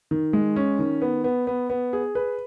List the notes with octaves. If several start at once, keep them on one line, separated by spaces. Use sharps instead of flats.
D#3
G#3
C#4
D#3
B3
B3
B3
B3
G#4
B4